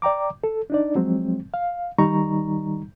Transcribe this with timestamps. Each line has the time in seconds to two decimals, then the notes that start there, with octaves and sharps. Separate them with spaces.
0.02 D5 G5 A#5 D6
0.44 A4
0.70 D4 D#4 D5
0.95 F3 F#3 G#3 C4
1.54 F5
1.98 D#3 G3 D#4 A#5 C#6